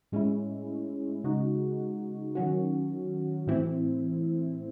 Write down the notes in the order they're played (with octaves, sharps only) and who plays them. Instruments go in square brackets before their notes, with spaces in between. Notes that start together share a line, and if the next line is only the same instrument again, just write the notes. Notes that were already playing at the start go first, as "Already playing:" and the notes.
[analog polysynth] A2 G#3 C#4 E4
C#3 G#3 D#4 F#4
D#3 F#3 C#4 F#4
A2 E3 C4 E4